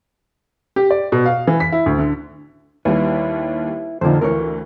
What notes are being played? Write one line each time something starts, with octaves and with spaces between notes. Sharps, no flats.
G4
D5
B2
F5
E3
B6
E4
D2
D3
D#2 G3 E4 B4
F2 A#2 D3 D#4 C5
D2 E3 A#4 C#5